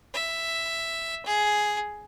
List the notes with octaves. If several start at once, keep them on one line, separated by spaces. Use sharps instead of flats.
E5
G#4